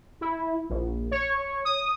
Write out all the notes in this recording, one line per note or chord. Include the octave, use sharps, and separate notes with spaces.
E4
A#1
C#5
D#6